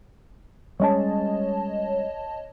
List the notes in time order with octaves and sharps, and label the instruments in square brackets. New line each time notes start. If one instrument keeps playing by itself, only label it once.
[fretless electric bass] G3 G#3 C#4 [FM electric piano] C#5 D#5 A5